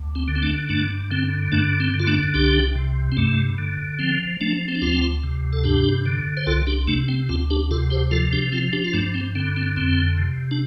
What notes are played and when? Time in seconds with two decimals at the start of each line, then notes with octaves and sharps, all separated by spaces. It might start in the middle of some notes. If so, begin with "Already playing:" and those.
Already playing: D2
0.15 C4
0.28 D3
0.36 C4
0.43 A3 D4
0.69 G2 A3 D4
1.11 D3 C4
1.52 G2 A3 D4
1.80 C4
1.94 D3
2.00 F4
2.07 A3 D4
2.34 C2 D4 G4
2.75 C3
3.12 C4
3.17 G2 A3
3.58 D3
3.99 F3 C4
4.41 F3 A3 D4
4.68 C4
4.75 D4
4.82 D2 C4 F4
5.24 C3
5.53 A4
5.64 G2 D4 G4
6.06 D3
6.37 C5
6.47 C2 F4 A4
6.67 D4 G4
6.88 C3 A3 D4
7.09 C4
7.29 D2 C4 F4
7.50 D4 G4
7.71 C3 F4 A4
7.90 G4 C5
8.11 F3 F4 A4
8.33 D4 G4
8.52 F3 C4 F4
8.73 D4 G4
8.84 F4
8.93 G2 A3 D4
9.14 C4
9.35 D3 C4
9.56 C4
9.76 F2 C4
10.17 C3
10.51 D4